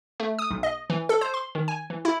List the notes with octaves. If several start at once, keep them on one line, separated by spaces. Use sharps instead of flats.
A3
D#6
B1
D#5
E3
A4
C5
C6
D#3
G#5
E3
E4